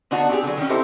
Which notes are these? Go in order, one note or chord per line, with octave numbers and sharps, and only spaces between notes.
D3 B3 D4 D#4 F#4
C4 G4 G#4
D3 F#3
D#3 C#4
C4 D#4 E4 G4 A4 C5